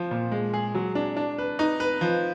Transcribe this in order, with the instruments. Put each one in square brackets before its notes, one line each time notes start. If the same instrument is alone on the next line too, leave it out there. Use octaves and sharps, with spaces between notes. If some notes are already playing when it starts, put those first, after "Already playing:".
Already playing: [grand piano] F3
A#2
G#3
G#4
F#3
D4
D4
B4
D#4
B4
F3